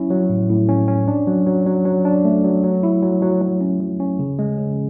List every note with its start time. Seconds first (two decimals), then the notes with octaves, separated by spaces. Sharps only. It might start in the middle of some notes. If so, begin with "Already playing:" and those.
Already playing: F#3 C#4 E4
0.10 F#3
0.30 A2
0.49 A2
0.69 C#4
0.88 C#4
1.08 D4
1.27 F#3
1.47 F#3
1.66 F#3
1.86 F#3
2.05 D4
2.25 A3
2.44 F#3
2.64 F#3
2.83 E4
3.03 F#3
3.22 F#3
3.42 F#3
3.61 C#4
3.80 F#3
4.00 C#4
4.19 C#3
4.39 G#3
4.58 C#3